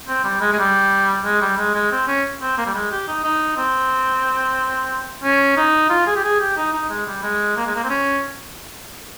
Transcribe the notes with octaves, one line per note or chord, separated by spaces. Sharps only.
C4
G3
G#3
G#3
G3
G#3
G3
G#3
G#3
C4
C#4
C4
A#3
G3
G#3
G4
D#4
D#4
C4
C#4
D#4
F4
G#4
G4
G#4
G4
D#4
D#4
G#3
G3
G#3
A#3
G#3
A#3
C4
C#4